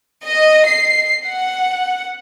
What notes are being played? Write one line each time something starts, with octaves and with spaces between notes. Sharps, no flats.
D#5
C7
F#5